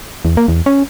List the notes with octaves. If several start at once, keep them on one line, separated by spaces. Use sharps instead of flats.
E2
A#3
E2
C#4